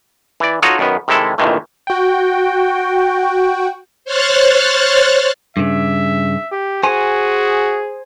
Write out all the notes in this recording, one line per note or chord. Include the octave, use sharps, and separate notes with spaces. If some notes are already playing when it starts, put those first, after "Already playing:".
E3 D5
D#4 F4 F#4 A4 C#5 D#5
F#2 D#3 B3
C3 D#3 G#3 E4 A4
A#1 F2 C3 D#3 E3 A3
F#4 G5
C5 C#5 F6 F#6 A6
G2 C#3 E5
G4
F#4 G#4 C5 G#5